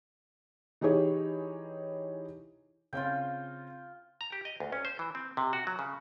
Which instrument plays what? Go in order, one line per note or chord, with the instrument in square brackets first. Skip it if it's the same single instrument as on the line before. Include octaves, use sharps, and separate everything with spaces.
[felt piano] E3 D#4 G4 G#4 C#5
[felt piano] C#3 C4 C#4 [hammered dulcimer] F4 G5
[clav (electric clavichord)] A#5
G4
D#5
D2
C#4
C5
E3
C4
C3
F#4
F#3
C#3